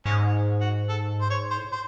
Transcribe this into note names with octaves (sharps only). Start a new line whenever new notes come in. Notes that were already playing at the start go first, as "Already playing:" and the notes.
G#2 C#4
F#4
A4
C5
C#5
C5
A2
C5